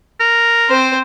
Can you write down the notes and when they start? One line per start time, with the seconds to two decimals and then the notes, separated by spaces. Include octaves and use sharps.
0.20 A#4
0.69 C4 C5